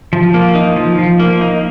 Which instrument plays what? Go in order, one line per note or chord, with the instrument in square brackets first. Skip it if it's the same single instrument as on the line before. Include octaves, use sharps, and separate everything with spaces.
[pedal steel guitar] F3
A#3
D#4
F3
F3
A#3
D#4